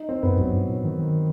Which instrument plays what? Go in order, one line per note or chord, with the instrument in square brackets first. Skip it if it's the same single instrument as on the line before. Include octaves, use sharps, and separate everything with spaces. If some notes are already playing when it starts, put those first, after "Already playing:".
Already playing: [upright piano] D#4
C4
[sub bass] F#2 [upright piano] B3
[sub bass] F#2
[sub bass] E2 [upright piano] F#3
[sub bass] G2
A2
D#3
D#3